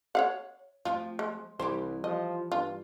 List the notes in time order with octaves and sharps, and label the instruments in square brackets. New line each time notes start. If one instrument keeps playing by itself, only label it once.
[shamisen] C#5 F5 F#5
[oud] F3 A3 C4 [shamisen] F4
[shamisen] G#3
[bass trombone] C2 [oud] E3 G3 G4 [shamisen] C5
[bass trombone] F3 [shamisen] D#5
[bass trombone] G2 [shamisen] F4